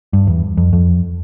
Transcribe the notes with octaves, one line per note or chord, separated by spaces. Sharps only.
G2
E2
F2
F2